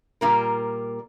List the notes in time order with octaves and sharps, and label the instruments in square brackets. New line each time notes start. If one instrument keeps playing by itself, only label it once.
[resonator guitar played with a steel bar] A#2 G3 A#3 F4 A#4